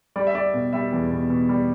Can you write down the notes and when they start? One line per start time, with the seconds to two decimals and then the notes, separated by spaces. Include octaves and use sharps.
0.16 G3 D5
0.27 E5
0.34 G3 D5
0.54 B2
0.73 G3 E5
0.92 E2
1.11 B2
1.30 B2
1.49 G3